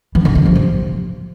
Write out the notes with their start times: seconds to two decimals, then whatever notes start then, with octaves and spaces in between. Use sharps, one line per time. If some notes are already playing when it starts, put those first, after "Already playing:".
0.15 E3
0.25 D3
0.35 D#3
0.45 F3
0.56 C3